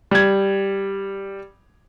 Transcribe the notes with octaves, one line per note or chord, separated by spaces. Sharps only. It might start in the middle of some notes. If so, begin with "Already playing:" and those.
G3 G#6